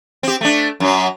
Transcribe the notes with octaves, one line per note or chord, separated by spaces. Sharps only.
C4 G4
A3 D4
F#2 F#3